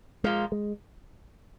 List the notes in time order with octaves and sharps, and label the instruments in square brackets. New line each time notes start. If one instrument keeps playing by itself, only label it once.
[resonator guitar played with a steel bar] A#2 F3 A#3 F4 [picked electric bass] G#3
[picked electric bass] G#3